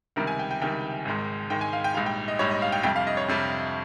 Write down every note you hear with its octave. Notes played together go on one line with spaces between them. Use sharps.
C#2 C3 D#3 G3 A#4
G#5
G5
G5
C#2 C3 D#3 G3 G5
G#1 G#2 D#3 G#3
G#1 G#2 D#3 G#3 G5
G#5
F5
G5
A#1 G#2 G3 F5
G5
D#5
A#1 G#2 G3 C#5
D#5
F5
G5
F2 C3 G3 G5
F5
D#5
C#5
F2 C3 G3